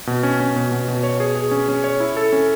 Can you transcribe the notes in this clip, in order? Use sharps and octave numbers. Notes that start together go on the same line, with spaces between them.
B2
C#4
C#4
B2
B2
B2
C#5
G#4
G#4
C#4
C#4
C#5
E4
A4
C#4